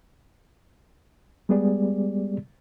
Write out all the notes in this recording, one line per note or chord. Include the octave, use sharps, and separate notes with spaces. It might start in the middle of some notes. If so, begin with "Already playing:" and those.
G3 G#3 B3 G4 G#4 D5